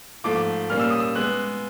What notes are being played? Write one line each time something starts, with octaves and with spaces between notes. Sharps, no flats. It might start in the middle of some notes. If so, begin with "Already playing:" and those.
G#2 F3 A3 D6
A#2 G3 A#3 C#4 F6
E6
D#6
E6
G#3 B3 F#6